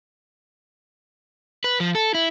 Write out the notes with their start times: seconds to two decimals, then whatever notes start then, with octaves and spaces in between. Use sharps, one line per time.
1.64 B4
1.80 F3
1.95 A4
2.14 E4